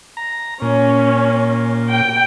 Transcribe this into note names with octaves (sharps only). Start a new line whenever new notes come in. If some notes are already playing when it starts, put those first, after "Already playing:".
A#5
A#2 C#4
G5